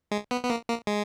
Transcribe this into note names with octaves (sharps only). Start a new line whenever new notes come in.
G#3
B3
B3
A#3
A#3
G#3